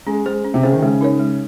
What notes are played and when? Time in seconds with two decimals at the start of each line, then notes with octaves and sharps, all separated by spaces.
0.06 G#3 C#4
0.26 G#3 G#4 C5
0.45 C#4
0.54 C3
0.63 C#3 G#4 C5
0.72 D#3
0.82 C#3 G#3
1.01 D#4 A#4 C#5
1.19 G#3